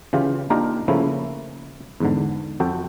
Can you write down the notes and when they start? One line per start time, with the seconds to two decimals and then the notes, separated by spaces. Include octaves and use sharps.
0.13 C#3 E3 F4 G4
0.50 A#3 D4 D#4 F4 G4 A#4
0.88 C#3 F3 A3 A#3 E4
2.00 E2 G#2 D3
2.60 F2 F#4 A4 G5